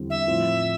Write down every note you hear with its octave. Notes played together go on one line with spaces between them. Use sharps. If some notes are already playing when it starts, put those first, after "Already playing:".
Already playing: E2 D3 G3 C4
E5
A2 F3 C4 F4